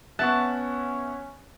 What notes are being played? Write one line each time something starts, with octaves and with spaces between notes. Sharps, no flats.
B3 C#4 E5 F#5 A5 C#6 F#6